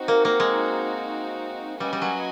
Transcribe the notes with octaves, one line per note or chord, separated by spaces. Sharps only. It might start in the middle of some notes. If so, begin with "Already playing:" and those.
Already playing: C4 D#4 F#4
A#3
A#3
G#3
G3 C#4 F#4 B4 D#5 G#5
G3
F#3